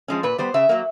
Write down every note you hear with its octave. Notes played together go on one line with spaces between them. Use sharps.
F3 G#3 C#4
A#2 B4
G3 B3 C5
C#3 E5
F#3 A#3